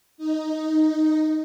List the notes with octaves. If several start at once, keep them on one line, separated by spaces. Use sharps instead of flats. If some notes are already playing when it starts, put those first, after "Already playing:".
D#4